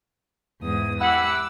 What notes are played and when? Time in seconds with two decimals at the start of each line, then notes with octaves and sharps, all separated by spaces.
0.61 E2 G#2 D#6
1.01 G3 E4 F#5 D6 E6